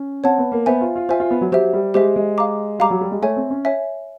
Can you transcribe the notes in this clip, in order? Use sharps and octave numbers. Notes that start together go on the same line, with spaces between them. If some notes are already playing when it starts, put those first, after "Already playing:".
Already playing: C#4
C4 C#5 F#5 A5
B3
A#3
B3 C5 E5 G#5
F4
F4
F4 C5 E5 G#5
F4
B3
F#3
F#3 G4 C5 E5
G3
G#3 G4 C5 E5
G#3
F5 A#5 D6
G3 F5 A#5 D6
F#3
G3
G#3
A3 C#5 E5 G#5
C4
C#4
C#5 E5 G#5